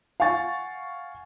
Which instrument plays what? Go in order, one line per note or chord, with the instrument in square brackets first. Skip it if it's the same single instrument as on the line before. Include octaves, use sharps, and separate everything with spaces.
[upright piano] F5 F#5 G#5 C#6 A6